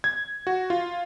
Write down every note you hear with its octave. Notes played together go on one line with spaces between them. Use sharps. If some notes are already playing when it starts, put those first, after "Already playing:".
G#6
F#4
F4